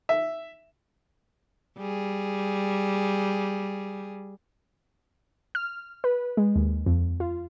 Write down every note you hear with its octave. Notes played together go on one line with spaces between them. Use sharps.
E5
G3 G#4
F6
B4
G#3
D#2
F2
F4